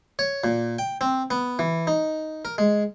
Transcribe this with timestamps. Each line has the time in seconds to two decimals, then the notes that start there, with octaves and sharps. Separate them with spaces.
0.19 C#5
0.44 A#2
0.79 G5
1.01 C4
1.31 B3
1.59 E3
1.87 D#4
2.45 A#4
2.58 G#3